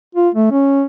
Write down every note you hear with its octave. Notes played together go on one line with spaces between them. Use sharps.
F4
A3
C#4